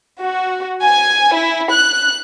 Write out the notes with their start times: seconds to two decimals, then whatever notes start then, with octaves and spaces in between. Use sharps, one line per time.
0.22 F#4
0.83 G#5
1.34 E4
1.71 F#6